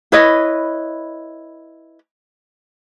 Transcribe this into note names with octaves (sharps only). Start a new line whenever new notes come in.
E4 B4 C#5 D#5